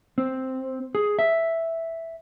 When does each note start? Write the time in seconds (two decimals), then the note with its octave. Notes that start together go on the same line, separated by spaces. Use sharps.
0.18 C4
0.95 G#4
1.19 E5